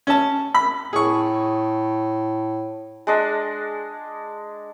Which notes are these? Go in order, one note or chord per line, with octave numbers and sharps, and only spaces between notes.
C#4 A5
B5
A2 G#4 C#6
G#3 D4 D#5